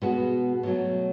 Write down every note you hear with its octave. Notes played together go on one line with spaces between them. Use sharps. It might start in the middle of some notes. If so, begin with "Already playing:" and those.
B2 G#3 B3 F#4
B2 F#3 A3